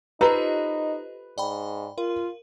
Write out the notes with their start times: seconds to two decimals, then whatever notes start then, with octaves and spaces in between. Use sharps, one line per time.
0.21 D#4 F4 G4 A4 B4 C5 D#5 A#5
1.38 G#2 D5 G5 B5
1.98 F4 A#4